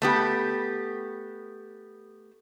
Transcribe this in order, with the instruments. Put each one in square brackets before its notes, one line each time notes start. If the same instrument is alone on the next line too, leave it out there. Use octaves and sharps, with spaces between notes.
[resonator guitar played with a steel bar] A3 B3 G4